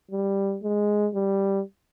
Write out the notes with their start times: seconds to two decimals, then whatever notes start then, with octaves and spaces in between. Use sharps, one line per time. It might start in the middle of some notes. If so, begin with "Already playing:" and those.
0.12 G3
0.63 G#3
1.15 G3